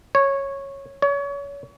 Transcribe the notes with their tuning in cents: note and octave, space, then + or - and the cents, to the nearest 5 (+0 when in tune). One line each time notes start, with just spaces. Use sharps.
C#5 -10
C#5 +30